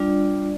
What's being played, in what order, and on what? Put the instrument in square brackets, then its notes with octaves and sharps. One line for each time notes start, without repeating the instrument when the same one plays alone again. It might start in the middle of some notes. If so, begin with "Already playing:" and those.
Already playing: [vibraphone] G3 D4 F4 D5